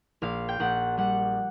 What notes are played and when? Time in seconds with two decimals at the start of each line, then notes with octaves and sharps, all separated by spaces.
0.22 A#1 F5
0.48 G5
0.60 A#1 F#5
0.97 G3 F#5